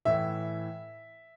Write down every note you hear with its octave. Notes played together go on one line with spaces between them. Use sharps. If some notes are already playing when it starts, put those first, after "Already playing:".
A2 E3 E5